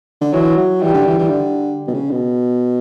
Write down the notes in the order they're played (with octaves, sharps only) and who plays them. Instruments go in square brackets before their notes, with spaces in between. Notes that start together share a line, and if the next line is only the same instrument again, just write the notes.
[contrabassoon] D3
[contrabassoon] E3 [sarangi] F#3
[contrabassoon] F#3
[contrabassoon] E3 [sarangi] G3
[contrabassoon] D3
E3
E3
D3
B2
C#3
B2